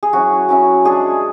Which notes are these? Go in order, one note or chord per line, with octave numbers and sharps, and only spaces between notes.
G#4
F#3 C#4 E4 F#4
F#3 C#4 E4
G#3 D4 G#4